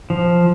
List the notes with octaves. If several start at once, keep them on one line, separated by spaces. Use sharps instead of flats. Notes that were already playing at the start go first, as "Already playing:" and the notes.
F3